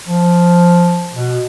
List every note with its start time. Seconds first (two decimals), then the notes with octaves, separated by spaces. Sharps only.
0.08 F3
1.13 B2